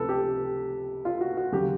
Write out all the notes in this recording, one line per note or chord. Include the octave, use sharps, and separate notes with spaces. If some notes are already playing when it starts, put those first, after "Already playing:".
Already playing: C#2 C3 F3 A3 A4 B4
G4
F4
F#4
F#4
D#2 C#3 F#3 G4